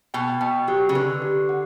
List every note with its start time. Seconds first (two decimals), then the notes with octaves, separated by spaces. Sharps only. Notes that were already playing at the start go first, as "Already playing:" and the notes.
0.14 B2 G5
0.41 B2 G5
0.68 F#3 G4
0.89 C#3
0.95 D3 B4
1.22 G4
1.49 F#5